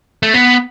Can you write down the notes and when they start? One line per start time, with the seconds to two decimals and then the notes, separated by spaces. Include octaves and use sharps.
0.23 A3
0.34 B3